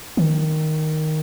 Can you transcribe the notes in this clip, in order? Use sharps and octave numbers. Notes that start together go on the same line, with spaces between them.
D#3